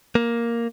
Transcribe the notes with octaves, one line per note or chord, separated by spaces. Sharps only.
A#3